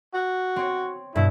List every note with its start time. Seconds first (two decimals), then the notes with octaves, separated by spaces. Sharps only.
0.14 F#4
0.56 C4 C#5
1.15 G2 B2 E4